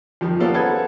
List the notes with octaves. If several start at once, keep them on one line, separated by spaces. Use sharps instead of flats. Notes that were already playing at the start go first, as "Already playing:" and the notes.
F2 D#3 F3 G3
A#3 B3 C#4 F4 A4
G#4 A4 B4 C5 F#5 G#6